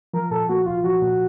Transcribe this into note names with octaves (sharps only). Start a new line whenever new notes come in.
F3 A#4
A#2 A4
A#3 F#4
C2 F4
F3 F#4
A#2